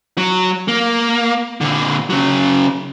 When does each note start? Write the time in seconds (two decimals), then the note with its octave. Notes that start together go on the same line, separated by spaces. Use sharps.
0.18 F#3
0.68 A#3
1.61 A#2 D3
2.10 C#3 F#3